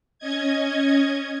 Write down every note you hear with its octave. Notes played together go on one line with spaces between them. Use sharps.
C#4 D#5 G#6